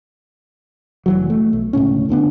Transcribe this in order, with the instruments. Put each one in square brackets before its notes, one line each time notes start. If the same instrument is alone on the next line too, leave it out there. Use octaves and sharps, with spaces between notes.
[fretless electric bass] F1 E3 F#3
A3
B1
D1 C#2 A2 C#4
E1 D3 B3 D4